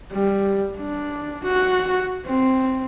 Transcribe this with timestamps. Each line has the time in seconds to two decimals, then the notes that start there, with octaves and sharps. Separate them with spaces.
0.12 G3
0.77 D4
1.44 F#4
2.25 C4